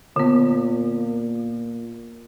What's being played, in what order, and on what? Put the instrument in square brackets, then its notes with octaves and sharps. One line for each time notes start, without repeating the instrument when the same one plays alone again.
[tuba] A#2 [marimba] D3 B3